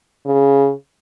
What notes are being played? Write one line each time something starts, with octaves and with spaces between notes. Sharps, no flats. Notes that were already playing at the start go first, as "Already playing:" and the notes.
C#3